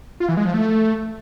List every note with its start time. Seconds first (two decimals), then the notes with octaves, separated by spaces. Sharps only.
0.20 F4
0.29 E3
0.37 G#3
0.45 F3
0.54 A3